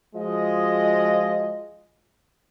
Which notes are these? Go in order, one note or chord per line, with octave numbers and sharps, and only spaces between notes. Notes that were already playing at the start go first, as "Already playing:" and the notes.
F3 G#3 F4 F#4 D#5